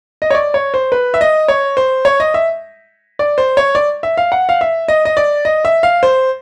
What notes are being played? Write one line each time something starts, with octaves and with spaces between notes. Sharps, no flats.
D#5
C#5
D5
C#5
C5
B4
E5
D#5
C#5
C5
C#5
D#5
E5
D5
C5
C#5
D5
E5
F5
F#5
F5
E5
D#5
D#5
D5
D#5
E5
F5
C5